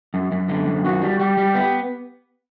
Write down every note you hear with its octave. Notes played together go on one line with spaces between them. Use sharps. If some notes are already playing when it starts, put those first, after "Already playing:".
F#2
F#2
D3
F#2
D#3 F#4
G3
G3 G4
G3
B3